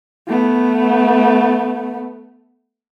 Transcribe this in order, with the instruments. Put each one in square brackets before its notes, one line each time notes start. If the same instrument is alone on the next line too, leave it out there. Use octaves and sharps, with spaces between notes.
[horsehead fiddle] A3 B3